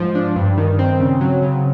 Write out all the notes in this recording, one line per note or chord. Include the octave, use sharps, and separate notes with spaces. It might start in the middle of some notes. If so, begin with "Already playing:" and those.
Already playing: G#2 F3
D4
G2
D#3
C4
C#3
F#3
C#3